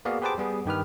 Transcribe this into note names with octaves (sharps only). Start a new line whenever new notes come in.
A#3 B3 F#4 G#4 D5 F5
G4 G#4 B4 C5 A5 D6
G3 B3 G#4
G2 D#3 G4 B4 F6